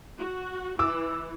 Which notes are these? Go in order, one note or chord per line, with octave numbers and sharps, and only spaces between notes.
F#4
E3 D6 E6